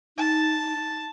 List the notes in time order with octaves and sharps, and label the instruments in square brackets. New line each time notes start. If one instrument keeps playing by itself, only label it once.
[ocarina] D#4 [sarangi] A5